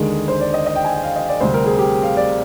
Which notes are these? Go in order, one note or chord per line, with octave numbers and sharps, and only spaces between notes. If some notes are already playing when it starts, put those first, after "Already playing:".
Already playing: D#2 D3 G#3 G#4
C5
D5
D#5
D#5
G5
G#5
G5
F5
D#5
D5
D2 C3 G3 C4 C5
A#4
G#4
G4
F5
D5